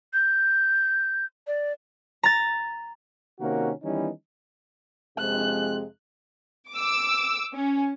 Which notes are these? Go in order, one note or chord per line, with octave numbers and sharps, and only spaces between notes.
G6
D5
A#5 A6
C3 D#3 A#3 C#4 F#4 A#4
D#3 E3 G3 B3 C#4 D#4
F2 C3 G#3 F#6
D6 E6
C#4